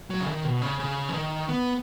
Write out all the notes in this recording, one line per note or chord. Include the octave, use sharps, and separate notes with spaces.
F#3
C#3
D#3
B2
C#3
C#3
E3
D#3
B3